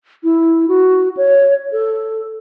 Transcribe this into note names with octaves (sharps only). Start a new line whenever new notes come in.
E4
F#4
C#5
A4